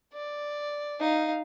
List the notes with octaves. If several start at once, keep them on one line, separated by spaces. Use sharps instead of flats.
D5
D#4 F5